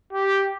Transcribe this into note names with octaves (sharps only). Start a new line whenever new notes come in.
G4